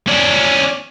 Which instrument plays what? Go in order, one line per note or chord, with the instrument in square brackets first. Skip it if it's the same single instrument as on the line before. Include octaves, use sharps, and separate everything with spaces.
[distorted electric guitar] C#4 D5